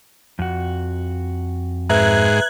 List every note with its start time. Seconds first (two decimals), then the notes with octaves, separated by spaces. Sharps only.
0.39 F2 F#4
1.89 G#2 B4 E5 A#5 F#6 G#6